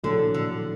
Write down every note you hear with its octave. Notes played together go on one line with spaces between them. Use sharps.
A#1 A2 D3 F#3 A3
D3